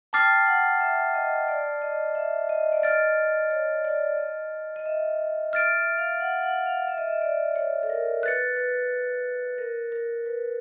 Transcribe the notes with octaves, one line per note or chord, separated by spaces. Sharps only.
G5 A5 D6 F6 A6 C7
F#5
E5
D#5
D5
D#5
E5
D#5
D5
D#5 F6 A6 D7
C#5
D5
D#5
D#5
E5
E5 F6 A6 D7
E5
F5
F#5
F#5
F5
E5
D#5
E5
D5
C#5
A4
A#4
B4 F#6 A6 C#7
B4
A#4
A#4
B4